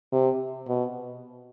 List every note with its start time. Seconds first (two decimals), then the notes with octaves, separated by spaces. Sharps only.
0.13 C3
0.68 B2